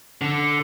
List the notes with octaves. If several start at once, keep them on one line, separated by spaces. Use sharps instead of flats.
D3